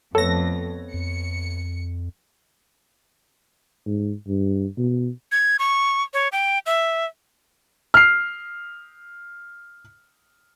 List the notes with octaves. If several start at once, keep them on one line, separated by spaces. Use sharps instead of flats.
F2 A3 B3 A4 C#5 A#6
F2 C#7
G#2
G2
B2
G#6
C#6
C#5
G5
E5
F6 C7